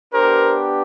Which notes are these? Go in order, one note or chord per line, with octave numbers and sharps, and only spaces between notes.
B3 D4 G4 A#4 C5